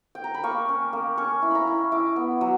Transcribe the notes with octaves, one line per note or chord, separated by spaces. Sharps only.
G5
A#5
B5
A#3 C#6
C#4
A#3
C#4 C#6
E4
A#5 B5
E4
E4 D6
B3
F#3